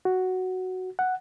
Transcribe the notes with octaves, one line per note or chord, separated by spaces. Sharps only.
F#4
F#5